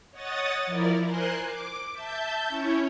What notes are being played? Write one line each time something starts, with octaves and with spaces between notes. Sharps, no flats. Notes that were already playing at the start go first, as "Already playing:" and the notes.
C#5 D#5 F#5 D#6 A6
F3 E4 A#4 D5
A#4 C5 G#5 C6 F#6
D6
E5 A5 G6
C#4 E4 C#5